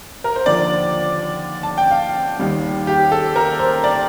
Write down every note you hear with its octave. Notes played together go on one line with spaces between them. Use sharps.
A#4
C5
D#2 D3 F3 D5
A5
G5
F5
D#2 D#3 G3
G4
A4
A#4
C5
D5